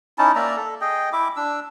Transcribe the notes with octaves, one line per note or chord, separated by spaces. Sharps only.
C#4 D#4 E4 A5
A#3 D5 E5 A#5
A4
G#4 D#5 G5
E4 E5 D6
D4 E6